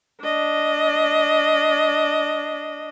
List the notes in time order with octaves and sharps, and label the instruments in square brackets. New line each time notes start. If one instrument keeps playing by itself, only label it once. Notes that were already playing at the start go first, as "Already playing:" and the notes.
[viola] D4 D#5